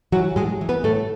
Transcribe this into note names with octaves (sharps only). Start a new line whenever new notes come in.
E3 F#3 F#4
A2 G#3 G#4
E3
B3 B4
A2 A3 A4